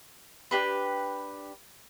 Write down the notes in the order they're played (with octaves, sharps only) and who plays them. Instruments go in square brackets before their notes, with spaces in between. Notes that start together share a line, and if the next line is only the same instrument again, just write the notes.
[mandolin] D4 G4 B4